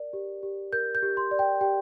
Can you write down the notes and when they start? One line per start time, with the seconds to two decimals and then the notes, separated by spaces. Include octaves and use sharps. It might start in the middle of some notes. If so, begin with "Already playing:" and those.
Already playing: A#4 D5
0.13 G4
0.43 G4
0.72 A#4 G6
0.95 G6
1.03 G4
1.17 C6
1.31 D5
1.39 G5
1.61 G4 G5